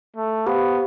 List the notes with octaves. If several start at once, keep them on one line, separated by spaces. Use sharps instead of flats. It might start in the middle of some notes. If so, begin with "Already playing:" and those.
A3
B3 G4 C5 F5